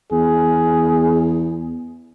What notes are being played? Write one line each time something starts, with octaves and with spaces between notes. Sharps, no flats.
E2 G#4